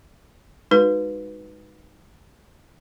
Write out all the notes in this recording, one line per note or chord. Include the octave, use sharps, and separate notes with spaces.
G#3 D#4 F#4 B4